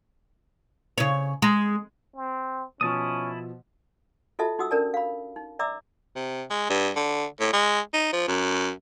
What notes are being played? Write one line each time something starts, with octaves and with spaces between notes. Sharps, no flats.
C#3 C#5
G#3
C4
B2 F3 C#4 E4 A5 D#6
F4 F#4 A4 D#5 E5 A5
D#4 F#4 F#5 D#6 E6
C#4 D4 A#4 D5 A5
F5 B5
D#4
D5 E5 A#5 D6 E6
C3
G#3
G2
D3
A2
G#3
D#4
F3
F#2